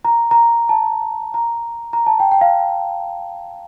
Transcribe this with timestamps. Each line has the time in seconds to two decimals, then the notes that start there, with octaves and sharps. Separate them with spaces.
0.05 A#5
0.31 A#5
0.69 A5
1.34 A#5
1.93 A#5
2.07 A5
2.20 G5
2.32 G5
2.41 F5